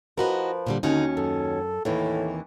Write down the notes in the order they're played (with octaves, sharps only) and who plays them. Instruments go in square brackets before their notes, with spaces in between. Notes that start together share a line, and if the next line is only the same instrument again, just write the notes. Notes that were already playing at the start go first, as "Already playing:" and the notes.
[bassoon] F3 [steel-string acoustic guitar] E4 F#4 D#5 [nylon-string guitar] A#4 B4
[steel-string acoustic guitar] A#2 D3 G3
[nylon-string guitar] D#2 C#4 F#4 [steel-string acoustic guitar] D3 D#4
[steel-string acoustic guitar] F#2 [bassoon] A4
[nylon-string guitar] D#2 E3 [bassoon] A2 [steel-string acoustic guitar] C3 A#3